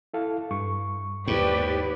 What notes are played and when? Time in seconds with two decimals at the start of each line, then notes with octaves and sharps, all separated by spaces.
0.14 E4 A4 F5
0.51 G2 C#6
1.27 D#2 G#2 G4 B4 D5